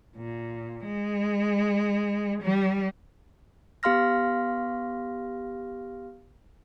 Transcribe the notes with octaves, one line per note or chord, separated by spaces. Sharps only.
A#2
G#3
G3
B3 G4 F5 C6 F6 A#6